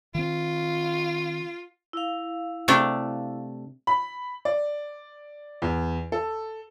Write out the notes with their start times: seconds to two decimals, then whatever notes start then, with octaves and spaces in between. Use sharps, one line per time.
0.15 D#3 C4 F4
1.93 E4 F5
2.68 C3 A3 D4
3.87 B5
4.45 D5
5.62 E2
6.12 A4